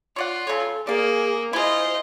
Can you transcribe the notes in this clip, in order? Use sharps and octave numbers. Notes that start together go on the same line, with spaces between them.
F4 C#5 D5 F#5
C#3 A4 C#5
A#3 G#4 D5 F5
E4 F4 G#4 C5 D#5